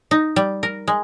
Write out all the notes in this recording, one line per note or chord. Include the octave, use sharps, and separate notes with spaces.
D#4
G3
A#4
G#3